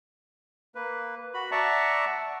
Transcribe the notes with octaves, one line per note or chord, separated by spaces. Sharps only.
A#3 B4
F#4 B5
D5 E5 F#5 A5 A#5 C#6